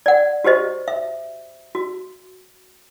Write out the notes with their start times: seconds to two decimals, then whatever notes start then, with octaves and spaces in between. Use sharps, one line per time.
0.06 D5 F#5
0.44 F#4 G4 C5 D#5
0.88 E5
1.75 F#4